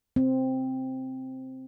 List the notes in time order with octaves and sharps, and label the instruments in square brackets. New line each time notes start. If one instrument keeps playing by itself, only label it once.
[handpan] C4